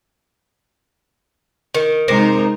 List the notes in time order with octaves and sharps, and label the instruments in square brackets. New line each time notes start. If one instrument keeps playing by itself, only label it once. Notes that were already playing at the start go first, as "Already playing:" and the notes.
[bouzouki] D#3
[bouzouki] C3 A#4 C5 [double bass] G#3 D#4